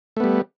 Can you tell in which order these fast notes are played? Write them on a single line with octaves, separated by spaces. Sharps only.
A3 B3 G3